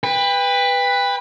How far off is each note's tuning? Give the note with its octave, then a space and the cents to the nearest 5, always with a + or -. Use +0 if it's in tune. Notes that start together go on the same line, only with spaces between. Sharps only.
B4 +5 G5 +35